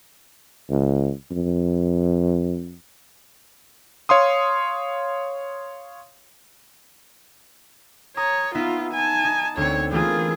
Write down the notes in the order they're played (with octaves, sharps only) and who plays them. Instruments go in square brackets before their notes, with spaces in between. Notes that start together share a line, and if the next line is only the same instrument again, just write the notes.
[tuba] C#2
F2
[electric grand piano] C#5 F5 C6 D#6
[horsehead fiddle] C#5 [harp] A#5 D#6
[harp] B3 D#4 E5 [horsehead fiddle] F4
[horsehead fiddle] G#5 A5
[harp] D#4
[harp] D2 C4 [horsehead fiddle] C#5
[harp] E3 A3 A#3 [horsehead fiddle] F4 G#4